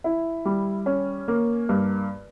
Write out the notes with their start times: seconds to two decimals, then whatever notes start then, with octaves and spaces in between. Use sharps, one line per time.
0.04 E4
0.45 G3
0.86 C#4
1.28 A#3
1.69 G2